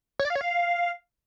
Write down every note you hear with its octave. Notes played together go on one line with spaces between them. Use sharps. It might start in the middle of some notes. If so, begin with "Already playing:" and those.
C#5
D5
F5
C#5
F5